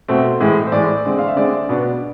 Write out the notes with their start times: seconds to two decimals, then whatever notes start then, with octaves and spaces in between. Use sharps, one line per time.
0.08 B2 A3 C4
0.40 A2 E3 G#3
0.67 C5
0.72 A2 E3 G#3 D5
1.05 D3 G#3 C4
1.19 F5
1.28 E5
1.36 D3 G#3 C4 D5
1.69 B2 B3 D4